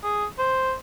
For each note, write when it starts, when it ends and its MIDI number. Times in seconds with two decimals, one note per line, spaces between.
0.03 0.26 68
0.39 0.74 72